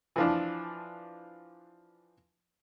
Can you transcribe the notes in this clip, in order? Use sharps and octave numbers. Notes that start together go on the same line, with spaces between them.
E3 F3 D4